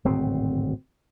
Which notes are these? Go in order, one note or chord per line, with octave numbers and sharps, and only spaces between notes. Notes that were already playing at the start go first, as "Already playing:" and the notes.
D1 G#1 B2 C4